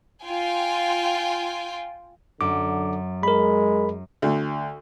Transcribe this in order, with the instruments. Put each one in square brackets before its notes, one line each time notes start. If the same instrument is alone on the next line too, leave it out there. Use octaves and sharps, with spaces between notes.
[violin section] F4 G5 G#5
[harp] F#2 [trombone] D3 [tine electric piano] D6
[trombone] G#3 [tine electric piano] A#4 B5
[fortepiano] D2